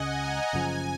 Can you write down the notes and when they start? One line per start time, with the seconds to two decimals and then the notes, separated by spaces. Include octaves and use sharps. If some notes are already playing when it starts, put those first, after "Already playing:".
Already playing: C#2 C#3 G#3 D#5 F#5 G#5
0.15 A#5
0.53 F#1 F#2 C#3 F3 G#5